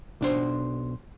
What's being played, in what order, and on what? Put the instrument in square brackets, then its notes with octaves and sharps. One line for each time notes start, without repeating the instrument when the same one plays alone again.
[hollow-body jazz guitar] B1 D4 C5